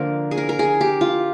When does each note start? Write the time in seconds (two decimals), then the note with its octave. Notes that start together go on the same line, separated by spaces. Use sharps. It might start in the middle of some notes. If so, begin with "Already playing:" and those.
Already playing: D3 F3 A#3 A#4
0.31 G#4
0.37 A#4
0.49 A#4
0.59 G#4
0.81 G4
1.01 F4